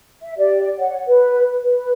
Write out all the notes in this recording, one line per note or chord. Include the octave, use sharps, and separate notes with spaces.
E5
G4 D5
C#5 F#5
B4
B4